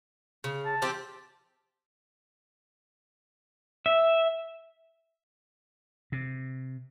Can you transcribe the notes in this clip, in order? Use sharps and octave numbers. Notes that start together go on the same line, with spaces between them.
C#3
A5
F3 C4 G4
E5
C3